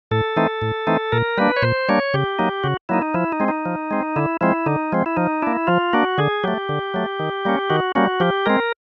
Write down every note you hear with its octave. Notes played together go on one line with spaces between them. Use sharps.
A2 A4
E3 A3 C4 D#4
A2
E3 A3 C4 D#4
A#2 A#4
G3 A#3 D4 B4
C#5
A#2 C5
G3 A#3 D4 C#5
C#3 G4
F#3 A#3 D#4
C#3 F#4
F#3 A#3 D#4 E4
D#4
F3 E4
D#4
G#3 C4
D#4
F3
G#3 C4
D3 E4
F3 G#3 C4 E4
D3 D#4
F3 G#3 C4
E4
F3 D#4
A#3 D4 E4
F3 F4
A#3 D4 F#4
D3 G#4
F#3 A3 G4
D3
F#3 A3
D#3
G3 A#3 C#4
D#3 F#4
G3 A#3 C#4 F#4
F3 G4
G#3 C4 A#4